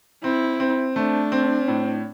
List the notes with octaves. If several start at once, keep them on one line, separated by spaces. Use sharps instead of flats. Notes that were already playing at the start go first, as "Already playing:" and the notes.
C4 E4
C4
A3 D4
C4
A2